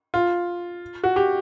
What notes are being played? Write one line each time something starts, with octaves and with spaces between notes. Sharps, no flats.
F4
F#4
G4